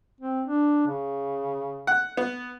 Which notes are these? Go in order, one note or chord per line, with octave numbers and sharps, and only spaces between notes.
C4
D4
C#3
F#5
B3